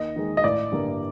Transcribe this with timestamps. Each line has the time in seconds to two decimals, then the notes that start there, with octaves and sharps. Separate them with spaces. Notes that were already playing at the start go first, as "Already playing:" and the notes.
Already playing: D#2 D#5
0.16 D#3 G#3
0.37 D#5
0.44 A1 D5
0.72 G2 D3 G3 A#3